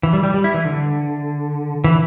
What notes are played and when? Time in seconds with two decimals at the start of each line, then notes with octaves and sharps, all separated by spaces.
0.03 E3
0.13 G3
0.23 G3
0.34 G3
0.44 E4
0.54 E3
0.65 D3
1.84 E3